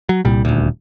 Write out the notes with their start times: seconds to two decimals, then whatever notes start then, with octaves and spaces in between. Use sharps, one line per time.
0.09 F#3
0.25 C2 A#2 G3
0.45 D#1 D2